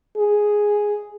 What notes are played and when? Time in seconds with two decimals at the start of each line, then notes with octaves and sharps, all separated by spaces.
0.18 G#4